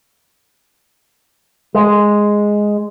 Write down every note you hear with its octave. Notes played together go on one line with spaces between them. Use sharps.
G#3